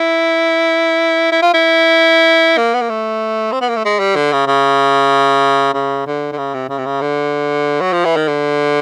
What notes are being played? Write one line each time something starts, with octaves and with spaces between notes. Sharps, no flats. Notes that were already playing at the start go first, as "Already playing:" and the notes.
Already playing: E4
E4
F4
E4
A#3
B3
A#3
A3
C4
B3
A#3
A3
G#3
G3
D3
C#3
C#3
C#3
D3
D3
C#3
C3
C#3
C3
C#3
D3
F#3
F3
E3
D#3
D3